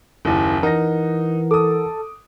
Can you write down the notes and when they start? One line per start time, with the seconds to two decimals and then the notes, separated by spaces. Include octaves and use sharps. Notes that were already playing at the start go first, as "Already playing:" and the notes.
0.25 F#1 D#2 C#4 E4
0.63 E3 D#4 A#4 F#5 A#6
1.51 A4 D6 D#6